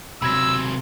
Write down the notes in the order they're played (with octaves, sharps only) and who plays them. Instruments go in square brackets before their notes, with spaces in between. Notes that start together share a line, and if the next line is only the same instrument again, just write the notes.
[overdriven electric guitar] C3 F#3 [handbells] B5 G#6 A#6 [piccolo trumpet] E6